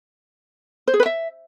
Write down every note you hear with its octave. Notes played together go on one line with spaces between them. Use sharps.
C5
G#4
B4
E5